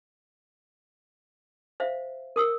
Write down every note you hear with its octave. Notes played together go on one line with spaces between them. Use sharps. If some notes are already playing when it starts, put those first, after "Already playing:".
C5 E5 F5
A#4 D#6 E6